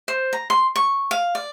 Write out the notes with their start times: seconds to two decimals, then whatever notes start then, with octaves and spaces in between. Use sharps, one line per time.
0.08 C5
0.33 A#5
0.50 C6
0.76 C#6
1.11 F5
1.35 D5